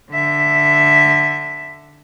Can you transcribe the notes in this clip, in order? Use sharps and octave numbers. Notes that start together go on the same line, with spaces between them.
D3 E5